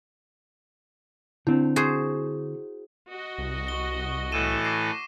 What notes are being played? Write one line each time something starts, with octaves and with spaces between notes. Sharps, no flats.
D3 C4 E4
F#4 G#4 C5
F#4 D#5
C2
C#6 G7
A2 E3 A4 D#7 E7
D6 A#6 C7